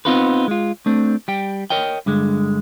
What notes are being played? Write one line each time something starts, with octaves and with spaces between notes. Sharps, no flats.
B3 C4 D#4 F4 A4 B4
G#3 F4
A3 C4 D4
G3 G5
A#4 C#5 D#5 G5
G2 D3 G#3